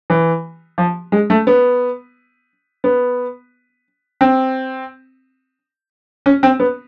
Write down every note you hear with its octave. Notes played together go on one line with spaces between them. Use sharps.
E3
F3
G#3
A3
B3
B3
C4
C#4
C4
B3